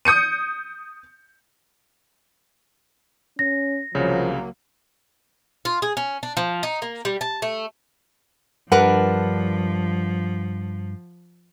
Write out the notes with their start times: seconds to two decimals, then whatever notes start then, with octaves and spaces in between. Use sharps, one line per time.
0.05 D#6 G6 C#7 D#7
3.39 C#4 A#6
3.95 C2 C#3 F3 F#3 A#3 C#5
5.65 F4
5.82 G#4
5.97 C#4
6.23 D4
6.37 F3
6.63 D#4
6.82 A#3
7.05 G3
7.21 A5
7.42 A3
8.72 G2 F3 D4 A#4 B4 F#5